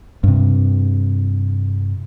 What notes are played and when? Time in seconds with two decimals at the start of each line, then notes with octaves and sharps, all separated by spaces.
0.24 G2 C3